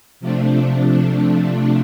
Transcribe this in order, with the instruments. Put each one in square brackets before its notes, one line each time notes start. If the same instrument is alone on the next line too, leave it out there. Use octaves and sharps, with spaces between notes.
[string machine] C3 F3 A3 D4